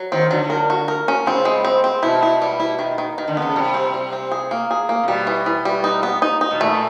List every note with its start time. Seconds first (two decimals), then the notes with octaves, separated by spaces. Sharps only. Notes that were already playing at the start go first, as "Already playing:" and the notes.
Already playing: F#3
0.12 D#3 C4
0.31 D3 F#3
0.50 A#4
0.70 F#4
0.88 A#4
1.08 C#4
1.26 C#3 C4
1.45 G#3
1.64 C4
1.84 C4
2.02 B2 E4
2.23 E4
2.42 G3
2.60 E4
2.79 D#3
2.98 D#3
3.18 D#3
3.28 D3
3.37 C#3 B3
3.56 C3 G3
3.74 C4
3.94 G3
4.13 C4
4.32 G#4
4.51 A#3
4.71 G#4
4.89 A#3
5.03 C3
5.08 B2 G3
5.27 E3
5.46 E3
5.65 G3
5.84 D#4
6.03 B3
6.22 D#4
6.41 D#4
6.51 B2
6.60 A#2 A3